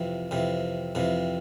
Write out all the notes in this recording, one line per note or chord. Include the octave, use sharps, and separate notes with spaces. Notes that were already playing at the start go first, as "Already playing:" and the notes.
Already playing: F2 C3 E3
F2 C3 E3
F2 C3 E3